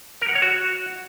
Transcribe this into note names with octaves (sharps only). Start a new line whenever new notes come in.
A#4
F#5
C#5
F#4